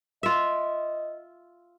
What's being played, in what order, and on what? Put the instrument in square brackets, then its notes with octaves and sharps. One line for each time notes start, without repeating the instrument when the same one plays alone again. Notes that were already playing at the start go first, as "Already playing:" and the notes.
[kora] F4 E5 [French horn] D#5